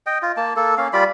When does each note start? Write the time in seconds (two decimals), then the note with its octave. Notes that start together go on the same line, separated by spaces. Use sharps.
0.06 D#5 G5
0.22 F4
0.37 A#3 A5
0.56 A#3 A4
0.78 A#3 C#4 F5
0.93 G3 F4 D5 B5